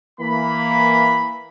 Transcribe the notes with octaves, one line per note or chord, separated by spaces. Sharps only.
E3 A#3 B5